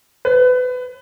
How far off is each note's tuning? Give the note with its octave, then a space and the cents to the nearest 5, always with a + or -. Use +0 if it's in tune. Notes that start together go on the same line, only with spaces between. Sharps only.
B4 +25